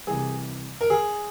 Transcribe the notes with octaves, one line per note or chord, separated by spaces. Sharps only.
C2 C3 E3 G3 G#4
A#4
G#4